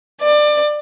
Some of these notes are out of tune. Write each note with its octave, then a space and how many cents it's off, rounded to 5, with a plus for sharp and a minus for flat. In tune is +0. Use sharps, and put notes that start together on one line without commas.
D5 +25